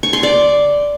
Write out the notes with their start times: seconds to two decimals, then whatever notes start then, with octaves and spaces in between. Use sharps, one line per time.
0.03 C#6
0.13 C6
0.23 D5